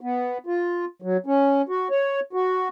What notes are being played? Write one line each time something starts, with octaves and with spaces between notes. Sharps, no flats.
B3
F4
F#3
C#4
F#4
C#5
F#4